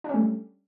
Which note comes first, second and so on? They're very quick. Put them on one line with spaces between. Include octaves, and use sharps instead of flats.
D4 C#4 A3 G3